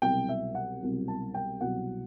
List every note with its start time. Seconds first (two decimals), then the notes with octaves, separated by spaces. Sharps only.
0.02 C2 B2 F#3 G5
0.29 E5
0.55 F#5
0.82 C2 B2 F#3
1.08 A5
1.34 G5
1.61 C2 B2 F#3 F#5